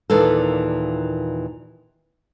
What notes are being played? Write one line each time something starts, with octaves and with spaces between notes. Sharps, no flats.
D#2 A#2 E3 D4 A4